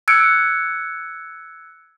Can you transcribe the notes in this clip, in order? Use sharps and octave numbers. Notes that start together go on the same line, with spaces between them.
E6 F#6 G#6 C#7 D7